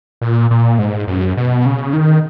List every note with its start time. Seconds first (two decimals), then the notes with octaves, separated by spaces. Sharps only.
0.21 A#2
0.51 A#2
0.79 G#2
1.07 F#2
1.37 B2
1.66 C#3
1.93 D#3